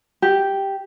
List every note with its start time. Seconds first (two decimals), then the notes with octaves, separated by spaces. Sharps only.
0.22 G4